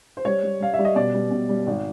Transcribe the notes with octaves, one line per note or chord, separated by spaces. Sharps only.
C5
G3 C#5
G3
G3 F5
E5
G3
D#5
B2 D5
G3
B2
G3
G#1